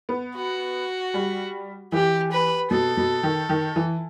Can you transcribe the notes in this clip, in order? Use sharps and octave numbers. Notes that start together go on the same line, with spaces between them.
B3
F#4
G3
E3 G4
B4
B2 A4
B2
D#3
D#3
E3